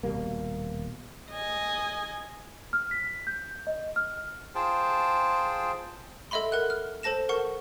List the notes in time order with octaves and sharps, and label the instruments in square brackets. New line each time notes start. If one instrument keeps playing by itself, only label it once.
[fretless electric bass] D#1 B2 G3 A#3
[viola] D#5 G#5
[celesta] F6
B6
G6
D#5
F6
[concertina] F4 G#4 C5 G5 A5
[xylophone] A4 D#5 E5 B5 C6
A#4 F#5 F#6
F6
A4 C5 A5 A#6 E7
A#4 F#5 C#6